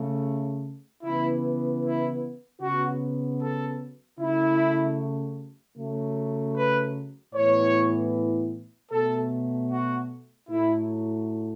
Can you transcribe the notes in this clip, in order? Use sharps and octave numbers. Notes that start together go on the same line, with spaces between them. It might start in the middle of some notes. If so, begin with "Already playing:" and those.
Already playing: C#3 A3
C#3 E3 B3 E4
E4
C#3 F#3 B3 F#4
A4
C#3 F#3 A3 E4
C#3 F#3 A3
B4
A2 E3 B3 C#5
B2 F#3 A3 A4
F#4
A2 F#3 A3 E4